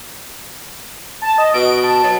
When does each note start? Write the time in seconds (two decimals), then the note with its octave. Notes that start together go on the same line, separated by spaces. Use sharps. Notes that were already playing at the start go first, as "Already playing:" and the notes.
1.22 A5
1.38 D#5
1.54 B2 D7
1.84 A5
2.04 F#3